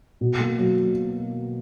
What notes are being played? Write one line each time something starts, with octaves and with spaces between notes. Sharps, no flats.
B2
A#3
F#3